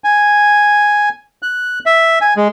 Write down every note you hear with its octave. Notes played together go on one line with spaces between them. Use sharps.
G#5
F#6
E5
G#5
G#3